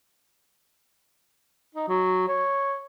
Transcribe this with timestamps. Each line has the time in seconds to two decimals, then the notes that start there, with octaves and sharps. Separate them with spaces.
1.75 D#4
1.88 F#3
2.28 C#5